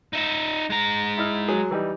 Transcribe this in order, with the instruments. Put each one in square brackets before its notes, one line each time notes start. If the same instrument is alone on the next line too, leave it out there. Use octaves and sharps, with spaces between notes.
[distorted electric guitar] D#4 E5
G#3 A#5
[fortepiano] E4 D#5 F6
F#3 G#4 G#5
E3 G3 D#4